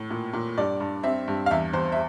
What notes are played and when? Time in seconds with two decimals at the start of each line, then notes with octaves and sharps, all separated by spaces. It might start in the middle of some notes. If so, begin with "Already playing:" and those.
Already playing: A2
0.10 A#2
0.33 A#2
0.58 G2 D5
0.80 G2
1.03 C4 E5
1.28 G2
1.46 F5
1.51 E2 E5
1.73 E2 C5
1.92 E5